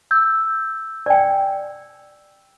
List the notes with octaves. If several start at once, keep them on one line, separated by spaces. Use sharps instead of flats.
E6 G6
D5 G5